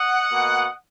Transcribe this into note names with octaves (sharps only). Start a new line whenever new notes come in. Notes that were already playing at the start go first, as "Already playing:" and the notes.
Already playing: D#5 F#5
B2 A#3